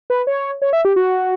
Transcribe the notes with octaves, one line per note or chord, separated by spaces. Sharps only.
B4
C#5
C#5
E5
G4
F#4